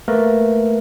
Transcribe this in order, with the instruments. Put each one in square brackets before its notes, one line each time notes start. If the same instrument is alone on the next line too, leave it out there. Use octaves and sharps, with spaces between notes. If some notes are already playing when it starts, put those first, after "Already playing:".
[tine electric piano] A3 A#3 A#4 B4